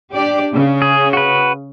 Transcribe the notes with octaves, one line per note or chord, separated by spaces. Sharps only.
D4 G4 D5
C#3
G#4
F#4 B4